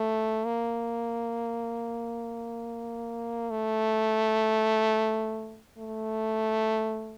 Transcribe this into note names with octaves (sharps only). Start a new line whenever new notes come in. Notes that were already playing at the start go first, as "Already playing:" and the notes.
Already playing: A3
A#3
A3
A3